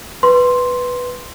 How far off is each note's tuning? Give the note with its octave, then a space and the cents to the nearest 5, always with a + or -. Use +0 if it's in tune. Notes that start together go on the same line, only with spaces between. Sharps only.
B4 +0 C6 +0